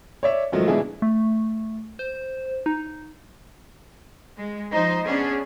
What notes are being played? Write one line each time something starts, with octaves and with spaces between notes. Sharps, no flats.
C#5 D5 E5
G#2 D#3 F3 F#3 A3
B2 E3 G#3 D4 E4 G#4
A3
C5
D#4
G#3
F3 D#4 C5
B3 C#4 D4 G#4